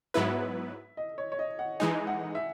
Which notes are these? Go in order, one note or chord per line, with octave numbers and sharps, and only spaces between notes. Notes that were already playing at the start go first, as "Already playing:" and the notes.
G#2 F#3 B3 E4 B4 E5
D#5
C#5
C#5
D#5
F#5
E3 G#3 D#4 G#5
F#5
E5